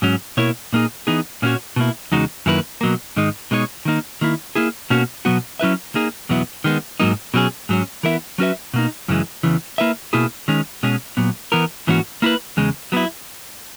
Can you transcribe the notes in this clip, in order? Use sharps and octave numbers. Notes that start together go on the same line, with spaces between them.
G#2 F#3 C#4
B2 A#3 E4 A#4 C#5
A#2 A#3 D#4 G#4
E3 B3 D#4 G#4
A#2 A#3 C#4 F#4 C#5
B2 A#3 E4
E2 C#3 G#3 D#4 F#4
F#2 D#3 A#3 E4 B4
B2 F#3 A#3
G#2 D#3 G#3 D#4
B2 G#3 D#4 A#4 C#5
D#3 A#3 D#4
D#3 A#3 E4
A#3 E4 G#4
B2 A#3 C#4 F#4
B2 F#3 B3 F#4
F#3 C#4 E4 B4 E5
A#3 D#4 G#4
E2 B2 F#3 B3 E4
D#3 G#3 B3
G#2 F#3 A#3 D#4
B2 F#3 C#4 G#4
G#2 F#3 C#4
E3 B3 E4 A#4 E5
F#3 C#4 F#4 B4 E5
B2 A#3 D#4
F#2 C#3 E3 G#3
E2 C#3 E3
A#3 E4 B4 E5
B2 A#3 E4 G#4
D#3 G#3 C#4
B2 G#3 C#4 G#4
A#2 F#3 B3
E3 B3 E4 A#4
G#2 E3 A#3 C#4 F#4
A#3 E4 B4
E2 C#3 G#3
F#3 B3 E4